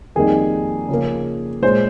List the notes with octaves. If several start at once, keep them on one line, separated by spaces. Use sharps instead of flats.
F2 D#3 G3 A#3 D#4 G#4
C#3 F3 A#3
A#2 G#3 C#4 C5